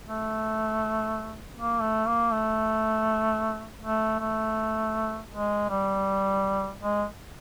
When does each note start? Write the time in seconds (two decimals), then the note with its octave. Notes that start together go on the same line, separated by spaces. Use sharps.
0.06 A3
1.57 A#3
1.81 A3
2.06 A#3
2.32 A3
3.81 A3
4.19 A3
5.32 G#3
5.69 G3
6.82 G#3